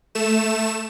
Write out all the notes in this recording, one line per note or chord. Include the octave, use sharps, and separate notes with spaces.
A3 E7